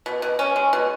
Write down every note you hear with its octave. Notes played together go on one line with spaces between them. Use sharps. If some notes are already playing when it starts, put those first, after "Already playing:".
B2
B2
C#4
G#3
B2